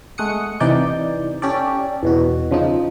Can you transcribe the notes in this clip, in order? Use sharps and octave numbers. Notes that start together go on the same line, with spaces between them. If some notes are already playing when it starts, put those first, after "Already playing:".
G#3 A3 F#5 D#6 C#7
C3 E3 D#4 D5 G6
C#4 G4 A4 D5
E2 B2 F#4
C#3 F3 D#4